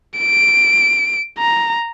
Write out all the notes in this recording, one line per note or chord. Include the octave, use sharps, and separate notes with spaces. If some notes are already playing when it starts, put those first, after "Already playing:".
D7
A#5